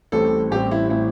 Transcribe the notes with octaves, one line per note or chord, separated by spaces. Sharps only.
A1 A2 G3 C4 A4
A1 A2 G3 C4 G4
E4
A2 G3 C4 E4